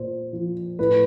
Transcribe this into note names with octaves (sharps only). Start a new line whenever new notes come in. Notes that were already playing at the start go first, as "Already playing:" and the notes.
Already playing: A#2 C5
F3
A2 B4